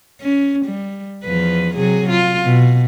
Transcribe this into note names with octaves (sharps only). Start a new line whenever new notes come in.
C#4
G3
E2 F3 B4
C3 F#3 G#4
F4
B2